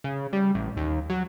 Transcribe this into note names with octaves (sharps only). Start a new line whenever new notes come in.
C#3
G3
A1
D#2
F#3